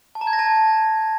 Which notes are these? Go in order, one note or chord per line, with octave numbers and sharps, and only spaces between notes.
A5
A#5
G#6
A#6
A5